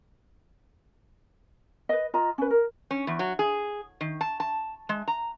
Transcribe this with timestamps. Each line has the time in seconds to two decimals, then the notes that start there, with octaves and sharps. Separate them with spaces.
1.89 B4 D#5
2.14 F4 D#5 A#5
2.38 C#4 B4
2.51 A#4
2.91 C#4
3.07 E2
3.19 F#3
3.39 G#4
4.01 D#3
4.21 A5
4.40 A5
4.89 G#3
5.08 A#5